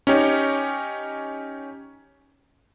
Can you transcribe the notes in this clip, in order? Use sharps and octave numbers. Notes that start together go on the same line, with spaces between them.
C#4 D#4 G4 C#5